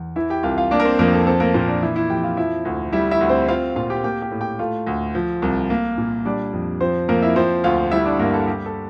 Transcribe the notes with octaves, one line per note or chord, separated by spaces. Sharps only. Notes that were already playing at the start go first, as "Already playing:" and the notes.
Already playing: E2
E3 E4 E5
G4 G5
C2 F4 F5
F4 F5
A#3 D4 D5
A#4
C4 C5
F2 A#3 A#4
A4
C4 A4
A#3 A#4
A#2 C4 C5
D4 D5
E3 E4 E5
E4 E5
F2 G4 G5
F4 F5
F3 E4 E5
D2
G3 E4 E5
E4 E5
D2
C4 C5
C4 F4 F5
A#2 F4 F5
G4 G5
A#3 G4 G5
G4 G5
A2
G4 G5
A3 F4 F5
D2
F3
C2
A#3
A#2
G3 D4 D5
F2
F3 C4 C5
F2 A#3 A#4
E4 E5
F3 C4 C5
D2 F4 F5
G3 E4 E5
D4 D5
G2 A#3 A#4
A4
G3 G4
A4